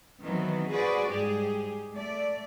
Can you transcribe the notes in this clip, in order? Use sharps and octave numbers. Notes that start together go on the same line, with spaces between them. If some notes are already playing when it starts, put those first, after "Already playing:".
D#3 E3 F#3 B3 C4
F#4 G#4 B4 C5 D5
G#2 G3 G4 G#4
A3 D5